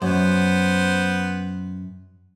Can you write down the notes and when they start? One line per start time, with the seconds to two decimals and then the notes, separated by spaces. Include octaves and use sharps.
0.02 F#2 B3 C5